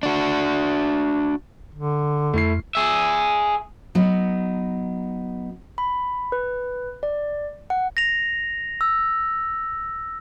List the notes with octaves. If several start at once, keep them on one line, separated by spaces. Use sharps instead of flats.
D4 F#4
D3
F2 A3 E4 C7
G#4 E5
F#3 B3 D#4
B5
B4
D5
F#5
A#6 F7
E6